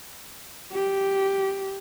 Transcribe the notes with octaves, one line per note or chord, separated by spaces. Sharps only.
G4